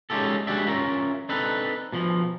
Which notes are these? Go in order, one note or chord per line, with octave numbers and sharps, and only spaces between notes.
G#3 C#4 D#4 F4 G4 A4
G#3 D4 F#4 G4 D5 E5
C#4 F4 A#4 E5
C4 D4 D#4 A4 B4
B2 F3